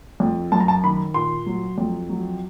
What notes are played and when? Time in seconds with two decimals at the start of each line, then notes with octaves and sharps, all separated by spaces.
0.20 F2
0.52 F#2 A5
0.60 A#5
0.68 A5
0.84 D#3 B5
1.14 A#2 C6
1.46 F#3
1.78 F2
2.09 F#3